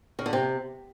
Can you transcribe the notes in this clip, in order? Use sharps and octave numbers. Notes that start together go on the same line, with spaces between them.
C#3
D3
C3